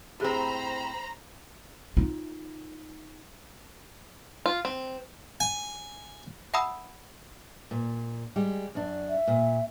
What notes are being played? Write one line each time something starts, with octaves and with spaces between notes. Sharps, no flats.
A2 C4 G4 G#4 C5 A#5 B5
D#4 F4
F4
C4
G#5
E5 F#5 A5 B5 D#6 E6
A#2
G3 G#3 G4
F#2 D4
E5
A#2